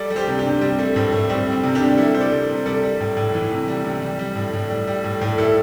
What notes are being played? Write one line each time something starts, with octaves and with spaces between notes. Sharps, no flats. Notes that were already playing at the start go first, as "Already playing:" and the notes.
Already playing: G3 A4 D5
G3
G4 C5
C3
D4 G4
C3
G3 C4
G3 A3
A2 C4
A2 A3
G3 C4
G3
C4
C3
D4 G4
C3
G3 E4 A4
G3 C5
A4 D5
C3
C3
G3 A4 D5
G3
A2
A2
E3
C3
G3
C3
G3
G3
A2
A2
G3
G3
A2
A2
G3 E4 A4